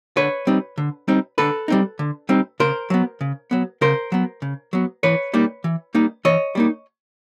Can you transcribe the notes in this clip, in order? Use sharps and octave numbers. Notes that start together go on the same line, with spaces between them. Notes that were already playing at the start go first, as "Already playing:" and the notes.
D3 B4 C#5
G3 C4 D#4
D3
G3 C4 D#4
D3 A4 B4
G3 C4 D#4
D3
G3 C4 D#4
C#3 A#4 C5
F#3 B3
C#3
F#3 B3
C#3 A#4 C5
F#3 B3
C#3
F#3 B3
E3 B4 C#5
G3 A#3 D#4
E3
G3 A#3 D#4
E3 C#5 D#5
G3 A#3 D#4